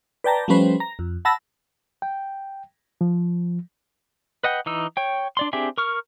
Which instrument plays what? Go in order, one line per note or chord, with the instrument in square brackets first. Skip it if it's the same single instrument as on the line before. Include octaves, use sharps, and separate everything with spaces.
[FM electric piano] B4 D5 G5 A5 A#5
F3 G3 A3 C#4 B4 C5
A#5
F2
F#5 A5 B5 E6 A#6
[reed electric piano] G5
F3
[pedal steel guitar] B4 D#5 F#5 G5
E3 D#4 E6
C#5 G5
D4 D5 C6
C4 D4 G4 G#4 E5
A#4 C#6 F6